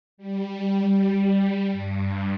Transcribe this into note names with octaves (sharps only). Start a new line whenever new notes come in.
G3
G2